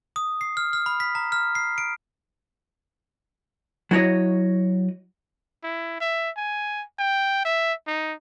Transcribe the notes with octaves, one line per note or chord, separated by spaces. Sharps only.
D#6
C7
F6
F6
B5
B6
A#5
F6
C7
D7
F#3 E4 F#4 C#5 D#5
E4
E5
G#5
G5
E5
D#4